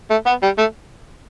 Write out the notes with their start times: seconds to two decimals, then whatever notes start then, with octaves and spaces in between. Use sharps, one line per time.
0.10 A3
0.26 B3
0.43 G3
0.58 A3